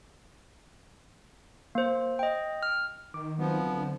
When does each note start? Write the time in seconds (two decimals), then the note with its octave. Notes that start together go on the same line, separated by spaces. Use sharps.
1.75 A#3 C5
2.19 D#5 G5
2.63 F6
3.14 D#3 D6
3.39 F3 F#3 B3 C4
3.66 D3